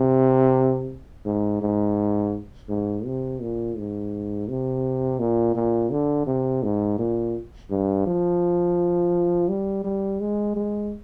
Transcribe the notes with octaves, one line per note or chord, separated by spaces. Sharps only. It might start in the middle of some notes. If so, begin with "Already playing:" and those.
Already playing: C3
G#2
G#2
G#2
C3
A#2
G#2
C3
A#2
A#2
D3
C3
G#2
A#2
G2
F3
G3
G3
G#3
G#3